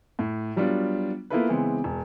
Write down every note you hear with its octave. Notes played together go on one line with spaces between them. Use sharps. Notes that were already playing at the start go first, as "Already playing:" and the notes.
A2
F#3 G3 B3 D4 F4
A#3 B3 E4 F4 A4 B4
C#3 E3 G#3 B3 C4
E1